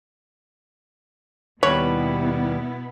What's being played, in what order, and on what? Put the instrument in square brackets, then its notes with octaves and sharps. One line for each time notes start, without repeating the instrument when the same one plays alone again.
[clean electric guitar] D#2 G3 B4 [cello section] B2 B3 E4 [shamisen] C#5